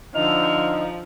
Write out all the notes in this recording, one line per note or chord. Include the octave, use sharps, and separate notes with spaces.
D3 F3 D#4 F6